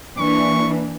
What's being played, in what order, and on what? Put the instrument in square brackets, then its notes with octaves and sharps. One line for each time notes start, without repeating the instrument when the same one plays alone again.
[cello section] E3 A#3 D4 [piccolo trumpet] C#6